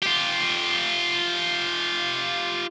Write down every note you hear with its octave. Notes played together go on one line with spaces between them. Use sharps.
F4 G4